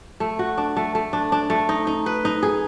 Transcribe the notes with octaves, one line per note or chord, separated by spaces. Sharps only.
A3
F#4
D4
A3
A3
D4
D4
A3
D#4
D#4
B4
D#4
G#4